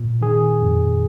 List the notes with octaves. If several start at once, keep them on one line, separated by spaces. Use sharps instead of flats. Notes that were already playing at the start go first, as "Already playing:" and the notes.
Already playing: A#2
D#3 G#4
F2